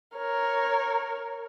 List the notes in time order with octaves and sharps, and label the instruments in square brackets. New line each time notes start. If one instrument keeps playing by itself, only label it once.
[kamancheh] A#4 C#5